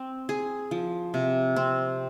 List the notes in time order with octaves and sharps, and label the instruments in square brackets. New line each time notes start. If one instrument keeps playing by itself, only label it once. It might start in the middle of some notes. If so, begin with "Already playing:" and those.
Already playing: [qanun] C4
G#4
F3
C3
C4